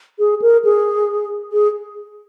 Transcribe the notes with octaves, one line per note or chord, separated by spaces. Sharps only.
G#4
A#4
G#4
G#4